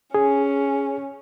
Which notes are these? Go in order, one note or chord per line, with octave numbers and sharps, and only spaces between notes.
C#4 G#4